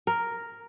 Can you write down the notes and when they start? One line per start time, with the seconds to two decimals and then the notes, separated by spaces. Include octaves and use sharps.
0.07 A#4